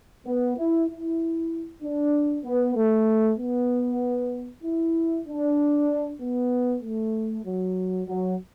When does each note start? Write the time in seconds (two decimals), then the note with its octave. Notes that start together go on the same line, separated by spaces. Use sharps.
0.25 B3
0.56 E4
0.88 E4
1.81 D4
2.44 B3
2.75 A3
3.38 B3
4.63 E4
5.26 D4
6.20 B3
6.82 A3
7.45 F#3
8.07 F#3